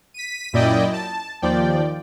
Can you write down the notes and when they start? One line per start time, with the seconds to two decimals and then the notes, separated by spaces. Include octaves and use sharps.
0.14 B6 D#7
0.53 F#2 A#2 E4 D5 D#5 G5
0.93 A5
1.42 D#2 F3 D5 G5